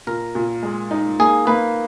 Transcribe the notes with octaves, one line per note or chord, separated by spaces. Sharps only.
A#2 A#4
A#2
G#3
D#4
A#3 G#4
A#3 B4